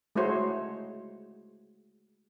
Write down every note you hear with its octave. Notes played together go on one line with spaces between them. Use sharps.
G#3 A3 E4 F#4 C5 C#5